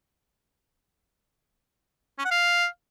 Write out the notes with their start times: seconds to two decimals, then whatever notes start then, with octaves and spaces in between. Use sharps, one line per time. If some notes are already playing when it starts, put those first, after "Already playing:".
2.19 C#4
2.25 F#5
2.31 F5